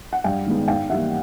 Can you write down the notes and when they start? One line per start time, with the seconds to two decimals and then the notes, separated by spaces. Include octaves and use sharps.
0.13 F#5
0.24 G2 F5 G5
0.46 D#3 G#3 B3
0.68 G#2 F5 G5
0.90 E3 G3 A#3 E5 F#5